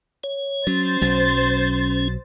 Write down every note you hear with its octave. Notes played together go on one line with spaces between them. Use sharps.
C#5
F#3 C#4 C5 A6
B1 F#3